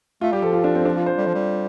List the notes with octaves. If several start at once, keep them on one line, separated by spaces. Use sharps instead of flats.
A3 F4
G3 G4
F3 A4
F4
D4
C4
D4
F4
C5
G3 A4
F3
G3